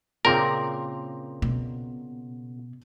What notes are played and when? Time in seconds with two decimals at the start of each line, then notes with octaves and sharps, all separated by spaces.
0.25 A#2 C#3 C4 A#4 A#5 C6 D6
1.42 B2